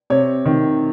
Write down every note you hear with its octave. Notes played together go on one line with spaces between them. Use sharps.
C3 C#5
D#3